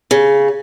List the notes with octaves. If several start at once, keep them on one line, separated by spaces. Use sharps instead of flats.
C#3